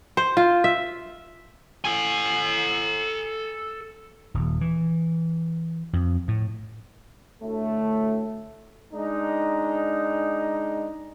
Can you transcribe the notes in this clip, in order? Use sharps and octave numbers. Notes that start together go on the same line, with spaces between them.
C5
F4
E5
A4 G#5
D#1
E3
F2
A2
D2 A2 A3
G#3 D4 D#4